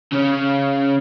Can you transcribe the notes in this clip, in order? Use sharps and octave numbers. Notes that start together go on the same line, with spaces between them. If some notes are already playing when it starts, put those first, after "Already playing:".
C#3 C#4